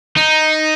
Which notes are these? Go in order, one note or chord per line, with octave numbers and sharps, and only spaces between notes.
D#4